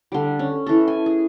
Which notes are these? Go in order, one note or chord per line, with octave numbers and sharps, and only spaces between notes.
D3 G3
C#4
E3 A4
G#5
G#4